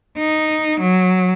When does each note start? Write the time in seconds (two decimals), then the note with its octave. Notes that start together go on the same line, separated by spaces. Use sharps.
0.19 D#4
0.81 F#3